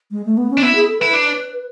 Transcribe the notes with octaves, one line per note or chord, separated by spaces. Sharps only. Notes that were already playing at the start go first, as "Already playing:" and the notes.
G#3
A3
B3
C#4
D4
B3 E4
G#4
A4
E4 B4
D4